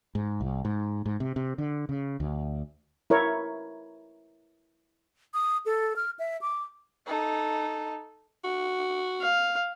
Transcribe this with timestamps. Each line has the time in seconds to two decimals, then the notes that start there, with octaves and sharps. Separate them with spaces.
0.15 G#2
0.40 C2
0.65 G#2
1.06 G#2
1.20 C3
1.36 C3
1.58 D3
1.89 C#3
2.20 D2
3.10 E4 A#4 C#5
5.34 D#6
5.66 A4
5.96 F6
6.19 E5
6.41 D6
7.06 D#4 A4
8.44 F#4
9.21 F5